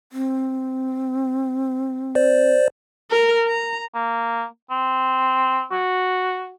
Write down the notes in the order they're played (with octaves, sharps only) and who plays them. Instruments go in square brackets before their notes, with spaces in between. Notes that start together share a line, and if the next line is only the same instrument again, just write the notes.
[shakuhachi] C4
[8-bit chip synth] C5 D5
[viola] A#4
A#5
[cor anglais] A#3
C4
F#4